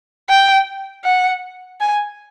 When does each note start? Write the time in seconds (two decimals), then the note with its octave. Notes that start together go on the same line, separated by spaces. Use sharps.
0.29 G5
1.04 F#5
1.80 G#5